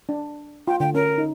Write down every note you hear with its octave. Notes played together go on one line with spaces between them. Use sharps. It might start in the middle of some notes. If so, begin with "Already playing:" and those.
D4
F4 G5
D3 G5
C#4 A#4
D#4